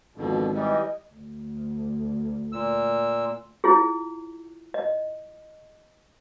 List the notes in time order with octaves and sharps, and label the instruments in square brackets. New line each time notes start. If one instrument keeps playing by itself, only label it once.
[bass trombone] G#1 [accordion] F2 B2 D3
[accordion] E3 G3 [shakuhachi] D#5
[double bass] D2
[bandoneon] A#2 E6
[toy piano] E4 F4 G#4
D#5